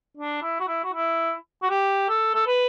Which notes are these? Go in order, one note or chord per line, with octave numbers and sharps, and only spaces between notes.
D4
E4
F#4
E4
F#4
E4
F#4
G4
A4
A4
B4